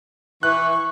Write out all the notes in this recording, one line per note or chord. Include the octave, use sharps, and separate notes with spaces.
E3 C#6 F#6